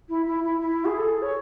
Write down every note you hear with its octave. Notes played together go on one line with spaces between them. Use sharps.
E4
E4
E4
E4
G#4
A4
G#4
C#5